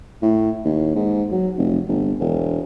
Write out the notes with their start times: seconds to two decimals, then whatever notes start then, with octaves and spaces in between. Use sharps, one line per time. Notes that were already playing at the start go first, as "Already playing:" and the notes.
0.22 A2
0.65 D#2
0.96 G#2
1.32 F#3
1.58 F1
1.89 G1
2.20 E1